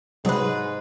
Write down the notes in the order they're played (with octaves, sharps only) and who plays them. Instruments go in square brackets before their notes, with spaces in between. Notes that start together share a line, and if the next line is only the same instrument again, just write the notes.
[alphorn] G#2 [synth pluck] C3 F#3 G#3 [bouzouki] G#4 B4